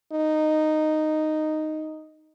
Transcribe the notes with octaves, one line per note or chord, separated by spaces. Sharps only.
D#4